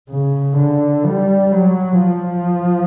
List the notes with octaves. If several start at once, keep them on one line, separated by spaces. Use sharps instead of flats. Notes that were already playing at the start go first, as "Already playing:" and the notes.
C#3
D3
G3
F#3
F3